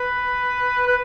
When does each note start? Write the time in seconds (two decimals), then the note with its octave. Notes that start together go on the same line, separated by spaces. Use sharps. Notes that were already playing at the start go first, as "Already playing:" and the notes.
Already playing: B4
0.87 B4